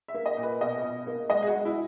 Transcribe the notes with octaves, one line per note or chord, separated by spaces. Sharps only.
E5
A#3
D#5
A#2
B4
B2 D#5
B2
A#3
G#3 D#5
G#4
F#4
G#3
E4